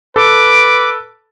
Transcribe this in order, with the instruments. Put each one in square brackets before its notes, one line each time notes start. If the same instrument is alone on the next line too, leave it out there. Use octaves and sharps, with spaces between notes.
[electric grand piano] A4 [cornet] B4 [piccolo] D6